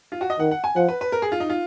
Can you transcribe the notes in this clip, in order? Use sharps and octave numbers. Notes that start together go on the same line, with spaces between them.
F4
F#4
D#5
D#3 F#5
F#5
G#5
F3 F#5
B4
B4
A#4
G#4
F4
D#4
F4